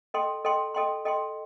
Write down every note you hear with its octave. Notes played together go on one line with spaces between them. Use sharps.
A4 D#5 G5 C6
A4 D#5 G5 C6
A4 D#5 G5 C6
A4 D#5 G5 C6